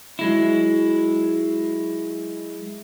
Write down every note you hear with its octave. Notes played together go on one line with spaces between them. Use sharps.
F#3 G#3 E4